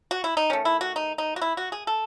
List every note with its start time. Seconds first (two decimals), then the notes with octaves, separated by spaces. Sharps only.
0.11 F#4
0.24 E4
0.37 D#4
0.50 D#3 A3 C#4
0.65 E4
0.81 F#4
0.96 D#4
1.18 D#4
1.36 F#4
1.41 E4
1.57 F#4
1.72 G#4
1.87 A4